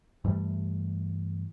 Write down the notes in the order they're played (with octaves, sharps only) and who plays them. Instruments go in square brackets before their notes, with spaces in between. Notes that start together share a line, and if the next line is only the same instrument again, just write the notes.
[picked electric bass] G2 E3 G3 A3